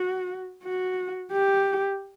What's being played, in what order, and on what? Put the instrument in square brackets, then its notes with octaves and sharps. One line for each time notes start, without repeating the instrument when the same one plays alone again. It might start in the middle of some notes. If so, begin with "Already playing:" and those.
Already playing: [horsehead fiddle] F#4
F#4
G4